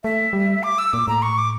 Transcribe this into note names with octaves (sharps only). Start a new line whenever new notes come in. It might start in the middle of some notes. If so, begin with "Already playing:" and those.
A3 E5
G3
D6
E6
A#2 D6
A2 A#5
C#6
D6